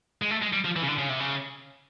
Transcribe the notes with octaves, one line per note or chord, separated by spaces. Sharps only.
G#3
A3
G#3
G3
F3
E3
C#3
D3
C#3
C3
C#3